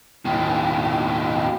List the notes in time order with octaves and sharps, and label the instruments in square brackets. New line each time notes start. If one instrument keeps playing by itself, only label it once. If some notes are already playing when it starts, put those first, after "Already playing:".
[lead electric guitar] D#2 A2